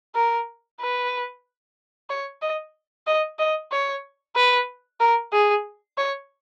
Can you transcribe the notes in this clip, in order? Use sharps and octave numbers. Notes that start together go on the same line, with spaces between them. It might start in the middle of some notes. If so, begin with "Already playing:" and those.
A#4
B4
C#5
D#5
D#5
D#5
C#5
B4
A#4
G#4
C#5